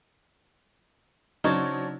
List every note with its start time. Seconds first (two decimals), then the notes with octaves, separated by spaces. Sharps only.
1.44 C#3 F#3 D4 D#4 C5 C#5 A5 F6